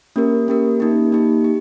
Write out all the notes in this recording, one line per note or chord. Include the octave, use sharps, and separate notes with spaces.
A#3 C#4 G4 A#4
A#3 C#4 G4 A#4
A#3 D#4 G4
A#3 D#4 G4
G4